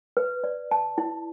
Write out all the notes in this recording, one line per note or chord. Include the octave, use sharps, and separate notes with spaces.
B4
D5
A5
E4